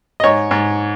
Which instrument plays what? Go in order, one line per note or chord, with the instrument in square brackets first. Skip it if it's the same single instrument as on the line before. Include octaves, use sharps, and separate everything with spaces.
[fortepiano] D#5
G#2 C#5
G#2